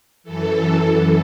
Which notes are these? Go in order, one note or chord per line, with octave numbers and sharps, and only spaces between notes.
F#2 E3 A4